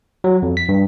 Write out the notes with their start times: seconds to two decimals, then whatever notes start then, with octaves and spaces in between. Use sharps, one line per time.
0.24 F#3
0.43 F2
0.57 B6
0.69 G2